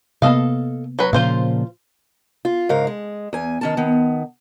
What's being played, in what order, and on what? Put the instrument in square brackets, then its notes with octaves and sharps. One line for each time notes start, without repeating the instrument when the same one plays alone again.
[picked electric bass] C3 A#3 B3 [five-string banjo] A4 D#5 F5
[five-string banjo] F#3 B4
[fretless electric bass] A#2 C#3 F3 [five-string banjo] F4 C5 F5
[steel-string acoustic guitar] F4
G#2 C#3 A#4 F5
G#3
E2 G#5
D#3 C#4 A5
D#3 B3